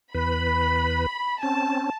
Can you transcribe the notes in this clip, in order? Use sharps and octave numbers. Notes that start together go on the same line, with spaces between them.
E2 B4 B5
C4 C#4 A5